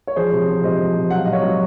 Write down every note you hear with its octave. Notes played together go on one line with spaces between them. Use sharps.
C#5
F3 G#4 C5
C3
F3
C3 C5 D#5
F3
C3
F#3 F#5
F5
C3 D#5
C#5 F5
F#3